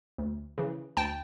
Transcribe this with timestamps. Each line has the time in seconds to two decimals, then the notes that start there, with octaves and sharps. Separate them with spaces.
0.18 D2
0.58 C#3 E3
0.97 D2 G5 A5